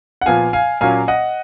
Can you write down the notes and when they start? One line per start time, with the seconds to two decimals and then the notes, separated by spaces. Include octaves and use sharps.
0.21 F#5
0.26 A#2 F3 B3 F5 G#5
0.53 F5 G#5
0.81 A#2 F#3 A#3 C#4 F5 G#5
1.08 D#5 F#5